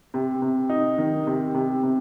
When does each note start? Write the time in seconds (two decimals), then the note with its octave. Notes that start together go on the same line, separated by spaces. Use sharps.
0.14 C3
0.42 C3
0.69 D#4
0.98 D#3
1.27 C3
1.54 C3
1.83 C3